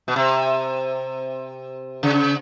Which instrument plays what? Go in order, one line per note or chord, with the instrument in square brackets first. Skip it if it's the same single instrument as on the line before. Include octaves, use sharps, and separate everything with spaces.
[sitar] B2
C3
C#3